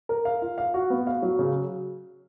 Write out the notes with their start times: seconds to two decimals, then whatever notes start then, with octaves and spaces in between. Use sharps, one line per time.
0.09 A#4
0.25 F5
0.42 F4
0.58 F5
0.74 F#4
0.90 B3
1.07 F5
1.22 F#3
1.39 C#3